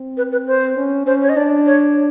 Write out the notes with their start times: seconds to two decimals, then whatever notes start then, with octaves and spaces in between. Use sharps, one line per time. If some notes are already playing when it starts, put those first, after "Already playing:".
Already playing: C4
0.17 B4
0.32 B4
0.47 C5
0.77 C#4
1.06 C#4 C5
1.22 C#5
1.29 D#5
1.36 D4 D5
1.66 C#5